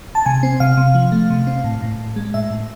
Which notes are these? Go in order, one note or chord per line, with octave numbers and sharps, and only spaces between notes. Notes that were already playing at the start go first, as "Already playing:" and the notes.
A5
C3 G#5
C4
C3 F5
C3
F3
A3
C3
C4
A2
A2
A2
G#3
A2 E5
A2